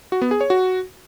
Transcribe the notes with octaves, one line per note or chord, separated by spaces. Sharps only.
F#4
B3
G#4
C#5
F#4